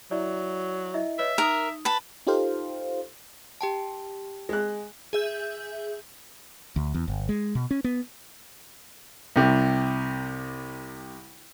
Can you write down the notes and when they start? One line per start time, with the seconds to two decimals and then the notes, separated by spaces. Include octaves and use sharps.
0.11 F#3 E4 D5 E5
0.94 E4 D#5 E5
1.18 B4 C#5 D#5 E5
1.38 D#4 A#4 D#6
1.85 B4 A5
2.27 D#4 F4 G4 A4 C5 F5
3.61 G4 G5 A5
4.49 G#3 F#6
5.13 G#4 E5 G6
6.76 D2
6.94 E2
7.08 G1
7.29 G#3
7.55 B2
7.71 C#4
7.84 B3
9.36 C2 C3